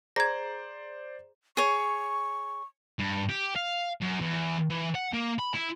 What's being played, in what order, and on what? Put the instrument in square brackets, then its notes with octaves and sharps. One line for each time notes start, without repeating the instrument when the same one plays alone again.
[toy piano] G#4 A#5 [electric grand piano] C5 D5 [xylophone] G#6 A#6
[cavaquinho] G#4 C#5 [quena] C#6
[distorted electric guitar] G2
G4
F5
F#2
E2
E3
F#5
A#3
B5
E4